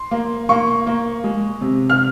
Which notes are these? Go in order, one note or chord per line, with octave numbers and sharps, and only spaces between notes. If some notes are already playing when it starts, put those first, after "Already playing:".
Already playing: C6
A#3
A#3 C#6
A#3
G#3
C3
F6